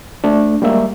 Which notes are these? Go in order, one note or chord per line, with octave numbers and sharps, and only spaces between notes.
A3 D4
G3 G#3 A#3 E5